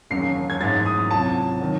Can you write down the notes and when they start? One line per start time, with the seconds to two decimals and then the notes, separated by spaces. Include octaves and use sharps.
0.10 E1 D#2 C#3 F#3 C7
0.50 G#6
0.60 A1 G#2 F#3 A6
0.85 D#6
1.11 C#2 C3 F#3 A5
1.60 D#3 F#3